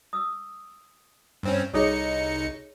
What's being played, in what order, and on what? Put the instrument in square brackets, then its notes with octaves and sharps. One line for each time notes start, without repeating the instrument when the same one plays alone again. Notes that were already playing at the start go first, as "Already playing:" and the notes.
[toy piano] D#6 E6
[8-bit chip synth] G2 C4 C#4
[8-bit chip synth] C2 D#4 C#7 [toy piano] G#4 A4 C#5